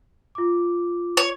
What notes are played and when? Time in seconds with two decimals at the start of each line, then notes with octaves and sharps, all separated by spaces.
0.35 F4 D6
1.17 C#5